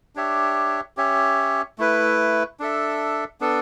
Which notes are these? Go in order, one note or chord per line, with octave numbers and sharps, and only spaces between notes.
D4 G4 C#5 E5
C#4 G4 C#5 E5
A3 E4 B4
D4 A4 E5
B3 D4 A4